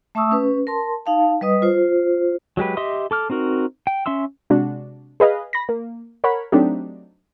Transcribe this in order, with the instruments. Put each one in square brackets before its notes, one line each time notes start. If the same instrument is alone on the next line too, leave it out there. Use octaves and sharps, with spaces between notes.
[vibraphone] A3 E5 A5 C#6 D#6 E6
C#4 B4
A#4 A5 C6
D#4 F5 A5
G3 B4 D#5 D#6
F4 C5
[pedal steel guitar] F#3 G#3 G4 B4
G4 D#5 E5 C6 D#6
A4 D6 F6
C4 D#4 F#4 A#4
G5
C#4 E5 C6 E6
[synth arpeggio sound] C3 G#3 D4 F#4
G#4 B4 D#5 F5
B5 A#6
A#3
A#4 C#5 F#5 B5
F#3 A3 C4 D4 D#4 G4